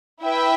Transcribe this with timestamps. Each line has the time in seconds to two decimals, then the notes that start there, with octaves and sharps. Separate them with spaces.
0.22 E4 B4 E5 G5